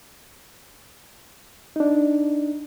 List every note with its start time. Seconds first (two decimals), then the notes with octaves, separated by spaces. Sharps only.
1.76 D4 D#4